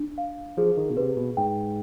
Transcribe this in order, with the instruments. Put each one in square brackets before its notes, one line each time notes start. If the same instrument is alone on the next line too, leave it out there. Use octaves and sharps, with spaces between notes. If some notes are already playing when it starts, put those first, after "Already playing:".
Already playing: [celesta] D4
F5
[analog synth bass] F3 [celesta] G#4
[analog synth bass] D#3
B2
[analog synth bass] C3 [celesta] B4
[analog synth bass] B2
[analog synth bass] G#2 [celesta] G5